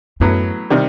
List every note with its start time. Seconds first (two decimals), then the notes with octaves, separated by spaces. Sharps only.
0.20 F#2 A2 F#3 B3
0.70 C3 D#3 G3